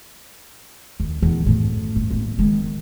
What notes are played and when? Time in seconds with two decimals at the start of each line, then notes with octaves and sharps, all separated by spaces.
1.00 D#2
1.22 E2 A#2
1.46 F#2 A2
1.96 G2
2.11 A1 A#3
2.39 D#3 G#3